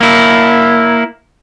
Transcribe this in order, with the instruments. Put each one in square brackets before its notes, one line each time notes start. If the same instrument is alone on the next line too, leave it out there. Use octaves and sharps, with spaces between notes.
[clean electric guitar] A#3 E4